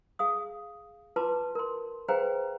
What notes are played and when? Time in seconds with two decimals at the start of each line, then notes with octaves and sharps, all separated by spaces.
0.19 G#4 F5 D#6
1.16 F4 B4 A5 C6 D6
1.55 A#4 C6
2.08 G#4 B4 C5 F5 G5 A#5